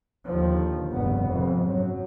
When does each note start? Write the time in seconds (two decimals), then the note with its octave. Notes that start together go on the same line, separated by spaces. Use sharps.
0.25 D#2 D3 D#3 F3
0.91 F1 A#1 G2 C#3 B3
1.25 F2 G#2 C3
1.68 F#2 F#3